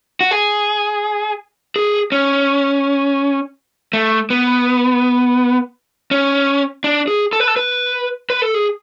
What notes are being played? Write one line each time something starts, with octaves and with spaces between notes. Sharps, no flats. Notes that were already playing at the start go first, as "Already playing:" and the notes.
F#4
G#4
G#4
C#4
A3
B3
C#4
D4
G#4
A4
B4
A4
B4
B4
A4
G#4